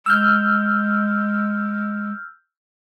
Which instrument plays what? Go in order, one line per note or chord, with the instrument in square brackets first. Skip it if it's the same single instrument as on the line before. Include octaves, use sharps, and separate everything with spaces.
[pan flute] G#3 [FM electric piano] E6 F6 G6